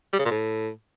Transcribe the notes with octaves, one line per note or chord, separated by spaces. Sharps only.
G3
C#3
A#2
A2